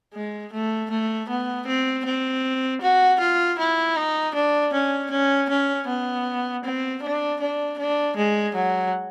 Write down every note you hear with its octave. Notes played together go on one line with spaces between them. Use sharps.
G#3
A3
A3
B3
C4
C4
F#4
F4
E4
D#4
D4
C#4
C#4
C#4
B3
C4
D4
D4
D4
G#3
F#3